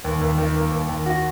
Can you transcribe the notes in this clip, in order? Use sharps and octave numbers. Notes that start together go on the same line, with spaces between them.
D#2
D#2
D#3
A#3
D#2
D#2
F#4